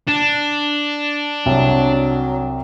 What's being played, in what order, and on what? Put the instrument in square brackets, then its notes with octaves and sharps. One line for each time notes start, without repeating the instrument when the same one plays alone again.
[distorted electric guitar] D4
[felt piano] C2 [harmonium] F#3